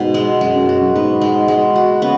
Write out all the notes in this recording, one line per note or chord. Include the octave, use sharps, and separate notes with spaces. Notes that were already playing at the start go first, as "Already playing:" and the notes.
Already playing: G#2 B2
G#3
F#2 G#3
F#2
F#2 F#4
F#2
G#2 B3
G#3
G#3
F#4
C#3 B3